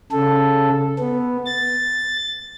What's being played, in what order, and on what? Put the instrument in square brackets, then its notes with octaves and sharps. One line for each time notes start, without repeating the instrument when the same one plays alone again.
[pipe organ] C#3 A4
B3
A6